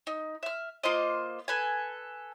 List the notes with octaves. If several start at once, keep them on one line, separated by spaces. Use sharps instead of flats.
D#4
E5 F6
A#3 F4 C5 D#5
A4 B4 G#5